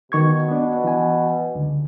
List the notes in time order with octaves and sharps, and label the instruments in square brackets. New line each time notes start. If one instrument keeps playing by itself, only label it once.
[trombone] B2 [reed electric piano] D#3 C#6 G#6
[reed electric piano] B3 D4
E3 G#5
C#2 D3